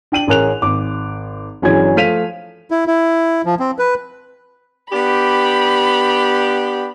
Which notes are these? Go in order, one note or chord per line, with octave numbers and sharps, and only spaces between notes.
D4 G5 D#7 F#7
A1 C#4 G#4 A#4 F#6 F7
G#1 D6
G1 E3 F#3 C#4 G#4 G#6
F3 A3 F5 B6 D#7 F7
E4
E4
F3
C4
B4
B3 D4 G4 B5